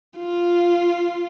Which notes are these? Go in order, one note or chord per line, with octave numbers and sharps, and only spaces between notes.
F4